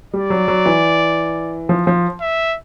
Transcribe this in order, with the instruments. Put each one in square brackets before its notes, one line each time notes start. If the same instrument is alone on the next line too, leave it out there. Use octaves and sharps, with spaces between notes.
[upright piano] G3 [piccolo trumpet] D5
[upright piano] F#3
F#3
E3
F3
F3
[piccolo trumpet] E5